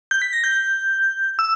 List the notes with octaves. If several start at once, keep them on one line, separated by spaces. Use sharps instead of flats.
G6
B6
A#6
G6
E6